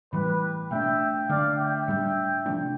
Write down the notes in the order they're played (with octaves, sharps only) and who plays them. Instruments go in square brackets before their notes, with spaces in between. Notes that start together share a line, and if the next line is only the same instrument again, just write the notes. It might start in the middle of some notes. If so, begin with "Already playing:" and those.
[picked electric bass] A2 E3 G3 [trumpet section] G4 B4
[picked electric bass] B2 A3 D4 [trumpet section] E5 G5
[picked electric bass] D3 A3 D4 [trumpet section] D5 F5
[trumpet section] E5 G5
[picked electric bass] A2 G3 D4
C3 F3 A3 D4